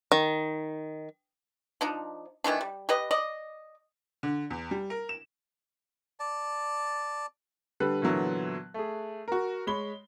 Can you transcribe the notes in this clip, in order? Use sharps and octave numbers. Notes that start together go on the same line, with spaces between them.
D#3
F3 D4 D#4
D#3 E3 A3 D4
G3
G4 B4 D#5
D5 D#5
D3
E2
G3
A#4
E7
D5 A5
D3 G3 B4 F#6
A#2 D3 E3 F#3 B3
A3 G#4
F#4 A#4
G#3 C#5 B5 G7